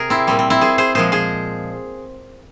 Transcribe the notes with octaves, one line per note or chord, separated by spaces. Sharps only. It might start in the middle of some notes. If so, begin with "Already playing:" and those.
Already playing: C3 G#4 A#4
C4 E4
A#2 G3 C4
C4
C4 E4
G#4 C5
G#4 C5
A#2 F3 G#3 G#4 C5
G#4 C5